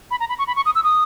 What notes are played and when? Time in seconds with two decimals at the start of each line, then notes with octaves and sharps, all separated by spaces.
0.11 B5
0.20 A#5
0.29 B5
0.39 C#6
0.47 B5
0.56 C#6
0.65 D#6
0.75 E6
0.84 D#6